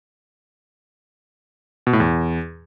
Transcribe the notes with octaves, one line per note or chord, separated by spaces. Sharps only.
B2
A2
E2